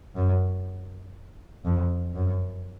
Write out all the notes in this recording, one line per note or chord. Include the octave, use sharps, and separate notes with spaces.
F#2
F2
F#2